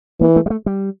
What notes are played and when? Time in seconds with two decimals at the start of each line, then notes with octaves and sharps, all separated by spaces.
0.21 E3 A#3
0.36 A3
0.46 G3
0.50 A3
0.66 G3